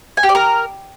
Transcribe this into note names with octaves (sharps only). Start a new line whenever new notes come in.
G#5
G4
D5
A#4